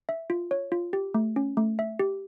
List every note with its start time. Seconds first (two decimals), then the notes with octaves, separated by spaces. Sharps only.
0.09 E5
0.30 F4
0.51 C#5
0.72 F4
0.93 G4
1.14 A3
1.36 C#4
1.57 A3
1.79 E5
1.99 G4